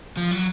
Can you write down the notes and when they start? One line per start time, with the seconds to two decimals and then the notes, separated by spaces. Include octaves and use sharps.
0.17 F3
0.31 F#3